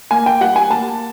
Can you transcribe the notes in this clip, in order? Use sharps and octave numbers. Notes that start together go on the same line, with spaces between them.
A#3 G#5
G5
G3 F#5
G#5
A#3 A5